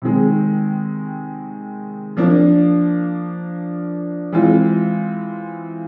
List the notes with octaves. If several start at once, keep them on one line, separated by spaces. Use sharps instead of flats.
C3 D#3 G#3
F3 A#3 D4
E3 G#3 C4 F4